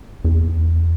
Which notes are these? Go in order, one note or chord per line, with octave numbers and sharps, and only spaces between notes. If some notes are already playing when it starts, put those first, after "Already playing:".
E2